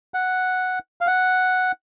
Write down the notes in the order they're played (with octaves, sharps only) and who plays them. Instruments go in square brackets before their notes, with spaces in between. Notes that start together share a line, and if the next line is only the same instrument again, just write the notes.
[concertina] F#5
F5
F#5